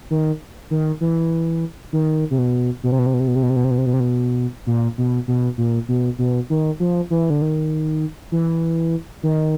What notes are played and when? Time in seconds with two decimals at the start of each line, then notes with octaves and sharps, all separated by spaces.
0.11 D#3
0.71 D#3
1.01 E3
1.93 D#3
2.31 C3
2.38 B2
2.83 B2
2.92 C3
2.99 B2
3.06 C3
3.14 B2
3.20 C3
3.27 B2
3.35 C3
3.43 B2
3.50 C3
3.56 B2
3.64 C3
3.71 B2
3.78 C3
3.86 B2
3.94 C3
4.00 B2
4.67 A#2
4.98 B2
5.28 B2
5.58 A#2
5.88 B2
6.19 B2
6.50 D#3
6.80 F3
7.10 E3
7.30 D3
7.42 D#3
8.32 E3
9.23 D#3